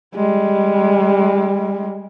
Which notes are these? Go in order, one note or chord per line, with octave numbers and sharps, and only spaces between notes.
G3 G#3